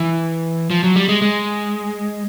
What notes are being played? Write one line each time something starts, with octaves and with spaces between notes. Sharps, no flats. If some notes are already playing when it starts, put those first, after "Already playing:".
Already playing: E3
F3
F#3
G3
G#3
G#3